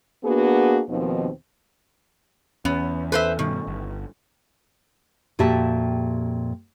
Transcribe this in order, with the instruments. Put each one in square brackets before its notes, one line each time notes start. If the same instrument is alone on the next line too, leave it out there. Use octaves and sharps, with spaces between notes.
[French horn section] A#3 B3 D4 F#4 G#4
D#2 B2 D#3 F3 C4
[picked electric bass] E2 [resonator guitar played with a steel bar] B3 [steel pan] C#4
[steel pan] A4 [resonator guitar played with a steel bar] B4 C5 E5
[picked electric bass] G2 B2 [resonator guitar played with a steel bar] D#3
[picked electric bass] G1
[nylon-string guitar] F2 A#2 F#4 G4 E5 A5